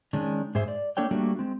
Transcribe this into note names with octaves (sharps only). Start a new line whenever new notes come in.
D#3 G#3 C#4 D4
G#2 G#4 C5 E5
D5
A#3 D4 A4 C#5 G5
G3 A3 A#3 D4 F#4
G#3 C4